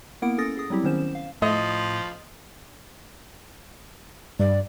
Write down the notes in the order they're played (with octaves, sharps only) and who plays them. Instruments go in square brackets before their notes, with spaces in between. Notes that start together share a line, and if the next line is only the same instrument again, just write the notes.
[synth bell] A#3 B3 E4 A#4 F#5 D7
C#4 A4 D#6 A6 A#6
G#4 D#6
F#3 G3 C4 E4 G4
D#3 B3 C#4 C5 E7
F5
[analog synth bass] A2 [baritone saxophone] F3 [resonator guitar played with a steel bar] D#5
[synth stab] G2 [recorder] D5